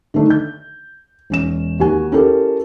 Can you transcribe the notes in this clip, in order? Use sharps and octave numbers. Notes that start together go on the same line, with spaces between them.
D3 D#3 A3 D4 D#4
G6
E1 C#4 E7
D#2 F#4 G#5
C#4 E4 G4 A4 A#4